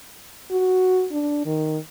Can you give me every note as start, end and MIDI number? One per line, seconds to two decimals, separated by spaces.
0.51 1.07 66
1.12 1.42 62
1.46 1.78 51